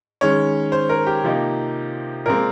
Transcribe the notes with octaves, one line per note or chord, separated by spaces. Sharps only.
D#3 G#3 C#4 C#5
C5
A#4
G4
C3 F3 A#3 D#4
A#2 F3 G#3 C4 A#4